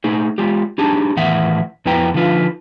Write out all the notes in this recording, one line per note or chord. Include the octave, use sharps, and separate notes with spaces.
A3 D#4 G#4
G#3 F4 G4
D4 D#4 G4 G#4 A5
A2 D#3 E3 E5 F#5
F2 B3 E4 B4 G5 A#5
D3 F3 D#4 F4 B4